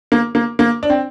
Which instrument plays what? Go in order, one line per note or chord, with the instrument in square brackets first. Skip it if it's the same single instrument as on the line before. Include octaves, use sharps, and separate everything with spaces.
[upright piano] A#3
A#3
A#3
D4
C4